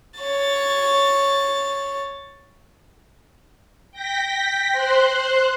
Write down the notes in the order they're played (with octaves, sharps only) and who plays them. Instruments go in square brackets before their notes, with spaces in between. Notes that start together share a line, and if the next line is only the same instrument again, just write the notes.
[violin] C#5 A6
[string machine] G5 A#6 B6
C5 C6 F#6